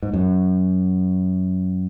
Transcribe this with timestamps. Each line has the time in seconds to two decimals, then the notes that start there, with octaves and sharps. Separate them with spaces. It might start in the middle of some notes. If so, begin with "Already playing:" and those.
0.02 G#2
0.13 F#2